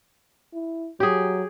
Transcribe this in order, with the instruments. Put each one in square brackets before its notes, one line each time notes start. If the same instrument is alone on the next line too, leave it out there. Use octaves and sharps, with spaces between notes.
[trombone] E4
[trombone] F#3 [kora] G4 G#4